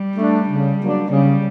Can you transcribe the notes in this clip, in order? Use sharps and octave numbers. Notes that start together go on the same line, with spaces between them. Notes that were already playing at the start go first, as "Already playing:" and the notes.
Already playing: G3
A3 D4
C#3
F#3 A#3 D4
C#3 G3